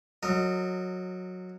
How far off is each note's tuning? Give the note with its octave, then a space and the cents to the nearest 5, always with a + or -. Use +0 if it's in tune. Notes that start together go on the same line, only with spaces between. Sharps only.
F#3 -15 A#4 -40 D#5 -10